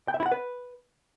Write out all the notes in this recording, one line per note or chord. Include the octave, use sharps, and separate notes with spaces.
G5
E5
E4
F#5
B4